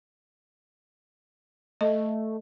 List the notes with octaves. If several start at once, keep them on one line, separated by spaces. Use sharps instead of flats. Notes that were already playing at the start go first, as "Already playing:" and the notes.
A3 D#5